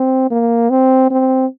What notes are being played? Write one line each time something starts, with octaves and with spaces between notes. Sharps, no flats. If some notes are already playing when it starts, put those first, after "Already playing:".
Already playing: C4
A#3
C4
C4